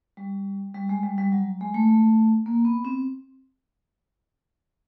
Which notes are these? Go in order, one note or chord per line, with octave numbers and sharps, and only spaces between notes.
G3
G3
G#3
G3
G3
F#3
G#3
A3
A3
A#3
B3
C4